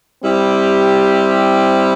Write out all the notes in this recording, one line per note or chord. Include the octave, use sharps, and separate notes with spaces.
G3 C4 E4 G4